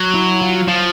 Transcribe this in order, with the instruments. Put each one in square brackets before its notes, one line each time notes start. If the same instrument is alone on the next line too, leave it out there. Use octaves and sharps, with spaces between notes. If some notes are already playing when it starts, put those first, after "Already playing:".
Already playing: [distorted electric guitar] F#3
[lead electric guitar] E4
F4
[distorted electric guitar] F3 [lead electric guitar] F4